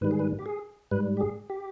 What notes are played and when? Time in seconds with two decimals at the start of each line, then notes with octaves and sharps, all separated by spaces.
0.01 G#2 D#3 G3 B4
0.11 G#4
0.19 B4
0.39 G4
0.46 G#4
0.91 G#2 G3 B4
1.17 G4
1.20 G#4
1.50 G4